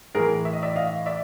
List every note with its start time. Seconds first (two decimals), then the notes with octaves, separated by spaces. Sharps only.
0.15 A2 E3 G#4 A#4
0.45 E5
0.53 D#5
0.63 D5 E5
0.76 D#5 F5
1.06 D5 E5